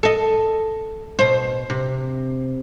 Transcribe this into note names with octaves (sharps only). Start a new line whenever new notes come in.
A4 D#5
B2 C5
C3